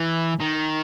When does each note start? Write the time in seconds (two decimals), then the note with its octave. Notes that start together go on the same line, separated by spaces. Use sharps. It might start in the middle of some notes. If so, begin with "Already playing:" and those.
Already playing: E3
0.40 D#3